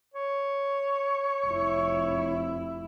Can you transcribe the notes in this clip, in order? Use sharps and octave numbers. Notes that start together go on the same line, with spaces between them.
C#5
F1 E4